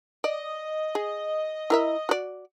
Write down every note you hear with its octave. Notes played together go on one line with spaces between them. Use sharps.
D5 D#5
G#4
E4 A#4 E5
F#4 D5